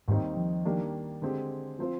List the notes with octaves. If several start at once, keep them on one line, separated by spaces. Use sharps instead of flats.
D#2 G#2 D#3 G3 C4 D#4
F3
D#3 G3 A#3 D4 G4
D3 G#3 C4 G4
F3 C4 F4 C5